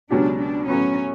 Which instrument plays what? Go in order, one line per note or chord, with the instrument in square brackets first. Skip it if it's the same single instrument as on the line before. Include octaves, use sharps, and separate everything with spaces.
[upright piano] C#2 B2 F#3 C#4 G4 [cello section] D4
[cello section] D4
[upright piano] A2 F#3 B3 [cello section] C#4